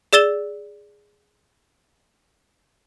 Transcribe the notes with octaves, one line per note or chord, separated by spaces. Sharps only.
G#4 D5 E6 A6 E7 G7